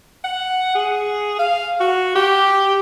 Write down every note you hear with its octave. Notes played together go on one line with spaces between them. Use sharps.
F#5
G#4
F5
F#4
G4